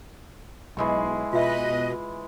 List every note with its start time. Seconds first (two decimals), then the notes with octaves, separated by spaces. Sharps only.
0.77 B1 E3 G#3 C#6
1.33 B2 F4 B4 D#5 E5